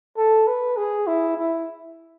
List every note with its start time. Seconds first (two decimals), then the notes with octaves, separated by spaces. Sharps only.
0.17 A4
0.47 B4
0.77 G#4
1.07 E4
1.38 E4